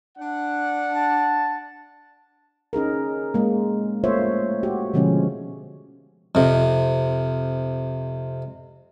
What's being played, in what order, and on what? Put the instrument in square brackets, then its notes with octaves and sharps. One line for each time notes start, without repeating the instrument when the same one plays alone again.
[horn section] D4 F#5
[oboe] A5
[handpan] C#4 D#4 G#4 A#4
G#3 A#3
A3 A#3 F4 C5 C#5 E5
F#4 G4
B2 D3 F3 G#3 C#4
[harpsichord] F2 C3